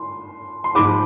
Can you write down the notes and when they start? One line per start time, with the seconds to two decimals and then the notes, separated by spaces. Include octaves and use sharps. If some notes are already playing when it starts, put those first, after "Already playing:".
Already playing: C6
0.64 C6
0.75 G#2 F3 B5 D6